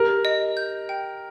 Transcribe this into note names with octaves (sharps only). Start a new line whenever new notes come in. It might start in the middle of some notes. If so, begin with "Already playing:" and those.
Already playing: G4 A#4
D#5
G6
G5